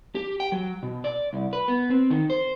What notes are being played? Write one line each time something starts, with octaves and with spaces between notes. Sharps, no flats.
G4
G5
F#3
B2
D5
C2
B4
B3
C4
D#3
C5